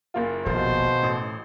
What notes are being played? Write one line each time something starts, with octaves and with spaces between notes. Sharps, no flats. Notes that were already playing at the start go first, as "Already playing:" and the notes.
F#1 A#3 F4
D#1 A#1 B2 C5
A1 A2